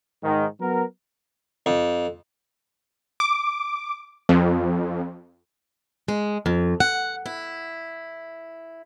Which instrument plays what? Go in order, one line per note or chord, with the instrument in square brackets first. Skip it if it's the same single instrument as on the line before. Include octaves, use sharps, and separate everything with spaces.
[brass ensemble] G#2 D#3
F#3 B3 A#4
[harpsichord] F2
[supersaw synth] D6
F2
[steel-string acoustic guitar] G#3
F2
F#5
E4